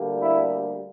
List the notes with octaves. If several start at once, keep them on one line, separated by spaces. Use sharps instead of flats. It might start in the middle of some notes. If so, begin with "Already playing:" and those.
Already playing: D2 D3 G3 A#3
E4